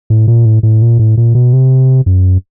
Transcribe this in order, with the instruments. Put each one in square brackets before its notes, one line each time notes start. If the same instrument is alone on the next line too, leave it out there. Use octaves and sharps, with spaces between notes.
[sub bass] A2
A#2
A2
A2
A#2
A2
A#2
B2
C3
F#2